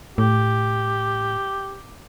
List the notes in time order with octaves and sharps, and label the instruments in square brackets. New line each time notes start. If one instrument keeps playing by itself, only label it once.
[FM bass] A2 [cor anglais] G4